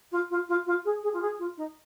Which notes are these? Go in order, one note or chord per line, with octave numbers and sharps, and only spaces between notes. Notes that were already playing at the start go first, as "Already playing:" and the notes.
F4
F4
F4
F4
G#4
G#4
F4
G#4
F4
D#4